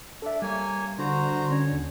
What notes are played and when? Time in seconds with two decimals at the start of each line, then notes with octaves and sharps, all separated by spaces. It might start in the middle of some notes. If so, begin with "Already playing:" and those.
0.22 D4 A4 E5
0.42 G3 A#3 C#5 G#5
0.98 D3 F#4 C5 A#5
1.51 C#4 C#5
1.72 D#2